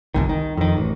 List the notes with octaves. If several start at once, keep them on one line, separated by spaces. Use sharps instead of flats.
G1 C2 D#3
D#3
F2 D#3
A1